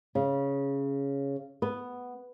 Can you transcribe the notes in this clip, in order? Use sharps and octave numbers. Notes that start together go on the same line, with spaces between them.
C#3
B3